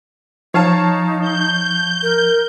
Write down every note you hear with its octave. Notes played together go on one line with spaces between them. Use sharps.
F3 D#4 C#5 F5 A5
G6
A#4